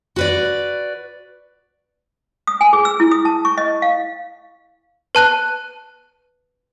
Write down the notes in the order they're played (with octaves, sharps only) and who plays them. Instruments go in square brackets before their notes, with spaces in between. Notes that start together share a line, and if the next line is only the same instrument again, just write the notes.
[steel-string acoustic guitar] F#4 B4 D5
[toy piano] D#6
G#5
G#4
E6
E4
D#6
A5
C#6
D#5
F5
[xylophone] B4 A5 F#6 D#7